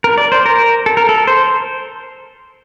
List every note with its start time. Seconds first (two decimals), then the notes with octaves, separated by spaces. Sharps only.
0.04 A#4
0.18 D5
0.32 C5
0.46 A#4
0.86 A4
0.97 A#4
1.09 A4
1.27 C5